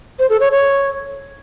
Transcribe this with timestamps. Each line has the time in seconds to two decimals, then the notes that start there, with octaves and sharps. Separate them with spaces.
0.19 C5
0.30 A4
0.40 C#5
0.51 C#5